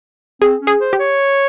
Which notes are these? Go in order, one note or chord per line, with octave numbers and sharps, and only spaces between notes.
C4 G#4
C#4
G#4
C5
G4
C#5